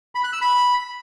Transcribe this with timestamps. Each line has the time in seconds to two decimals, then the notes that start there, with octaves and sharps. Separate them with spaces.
0.15 B5
0.24 F#6
0.33 E6
0.41 B5